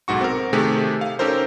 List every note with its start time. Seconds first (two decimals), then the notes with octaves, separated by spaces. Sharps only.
0.08 B1 G#2 F#4 C#6
0.21 C4 A#4
0.53 C3 D#3 A3 G4 G#4
1.01 F5
1.19 C#4 D#4 G4 A4 A#4 C5